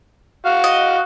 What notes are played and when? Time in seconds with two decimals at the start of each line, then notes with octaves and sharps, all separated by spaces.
0.45 F#4 F5
0.64 D#5